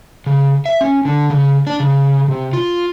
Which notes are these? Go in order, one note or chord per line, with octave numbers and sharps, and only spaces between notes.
C#3
E5
C#4
D3
C#3
D4
C#3
C3
F4